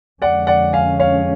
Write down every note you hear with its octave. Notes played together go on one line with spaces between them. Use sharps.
F2 D3 G#3 C#4 D5 F#5
D5 F#5
F5 G#5
C#5 F5